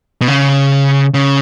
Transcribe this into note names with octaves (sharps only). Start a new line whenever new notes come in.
B2
C#3
C#3